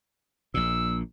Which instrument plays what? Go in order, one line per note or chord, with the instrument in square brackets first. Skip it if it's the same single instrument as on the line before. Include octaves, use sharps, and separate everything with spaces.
[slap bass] A#1 A#2 [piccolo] E6